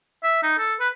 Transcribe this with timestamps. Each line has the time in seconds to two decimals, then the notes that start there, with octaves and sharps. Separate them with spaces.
0.23 E5
0.43 D#4
0.58 A4
0.80 B4